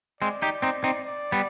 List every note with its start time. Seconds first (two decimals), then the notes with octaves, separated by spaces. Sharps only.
0.21 G#3 C4 D5
0.42 D#4 G4
0.62 C4 D#4
0.84 C4 D#4
1.05 D5
1.32 G3 B3